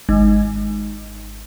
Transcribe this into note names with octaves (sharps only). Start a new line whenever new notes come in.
G#1